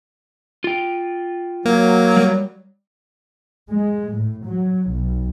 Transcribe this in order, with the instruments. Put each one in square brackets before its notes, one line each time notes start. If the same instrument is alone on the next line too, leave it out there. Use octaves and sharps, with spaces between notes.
[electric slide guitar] F4 G5
[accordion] F#3 [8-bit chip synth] A#3
[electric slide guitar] G3
[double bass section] G#3
A2
F#3
B1